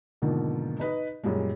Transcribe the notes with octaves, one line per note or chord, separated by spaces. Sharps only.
G#2 B2 D3 D#3 F3 A#3
D#4 B4 D#5
F#2 A#2 G3 G#3